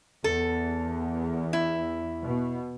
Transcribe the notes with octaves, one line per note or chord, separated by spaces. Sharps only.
E2 A4
E4
B2